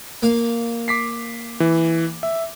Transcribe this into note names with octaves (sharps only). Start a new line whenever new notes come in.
A#3 F5
D6 B6 C7
E3
E5